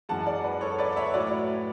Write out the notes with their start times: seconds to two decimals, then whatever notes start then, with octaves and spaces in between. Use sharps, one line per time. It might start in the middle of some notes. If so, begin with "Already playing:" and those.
0.09 F#2 E3 G#3 F#5 A5
0.27 D5 F#5
0.44 B4
0.61 A4 C#5
0.78 B4 D5
0.93 F#5
0.96 C#5 E5
1.14 A2 F#3 B4 D5